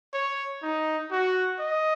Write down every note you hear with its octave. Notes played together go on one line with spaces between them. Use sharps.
C#5
D#4
F#4
D#5